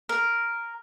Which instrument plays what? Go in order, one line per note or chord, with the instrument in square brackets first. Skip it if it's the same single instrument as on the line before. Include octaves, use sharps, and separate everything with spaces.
[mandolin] A#4